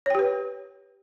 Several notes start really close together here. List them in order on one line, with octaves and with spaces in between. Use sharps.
C#5 G5 G4 B4